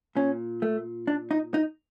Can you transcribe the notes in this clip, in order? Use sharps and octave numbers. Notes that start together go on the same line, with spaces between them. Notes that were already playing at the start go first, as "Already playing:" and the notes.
A#2 C#4
A3
D4
D#4
D#4